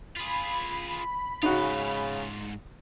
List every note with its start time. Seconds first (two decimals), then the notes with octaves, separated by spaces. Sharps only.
0.16 F4 G#4 B5
1.43 G#2 C#3 D#4 F4 F#4